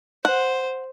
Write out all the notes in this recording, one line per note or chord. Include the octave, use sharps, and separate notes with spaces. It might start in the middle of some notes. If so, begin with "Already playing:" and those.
C5 F#5